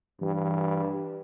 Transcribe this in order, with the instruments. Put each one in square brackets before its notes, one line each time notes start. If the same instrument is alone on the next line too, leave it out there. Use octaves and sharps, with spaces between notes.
[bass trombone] G2 [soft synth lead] E3